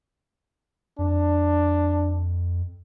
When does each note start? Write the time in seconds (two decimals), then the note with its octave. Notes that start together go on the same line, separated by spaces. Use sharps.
0.99 F2 D4